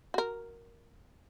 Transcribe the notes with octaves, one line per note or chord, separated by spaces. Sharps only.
F#4 A#4